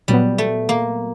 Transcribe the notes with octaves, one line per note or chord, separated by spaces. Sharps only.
A#2 F#3 G3 B3
A3
A#3